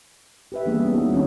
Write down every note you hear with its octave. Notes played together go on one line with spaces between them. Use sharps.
G4 B4 E5
E3 G3 A#3 B3 D4 G#4
B3 C#4
G3 D#4 F#4
D#3 E3 C4 C#4